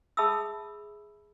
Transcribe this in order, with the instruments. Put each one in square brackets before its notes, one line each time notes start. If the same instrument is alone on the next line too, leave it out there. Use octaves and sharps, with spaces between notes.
[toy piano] G#4 E5 A5 B5 D#6 E6